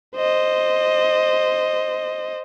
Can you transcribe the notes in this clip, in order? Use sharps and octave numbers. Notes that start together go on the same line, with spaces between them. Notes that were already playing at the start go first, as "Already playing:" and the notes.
C5 D#5